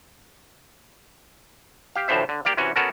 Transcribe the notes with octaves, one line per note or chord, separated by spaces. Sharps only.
G4 F5
D2 A2 E3 F3 C5 E5
D3
A#3 G4 D5 F5
C3 E3 C#4 F#4
B3 C#4 F#4 A4 A#4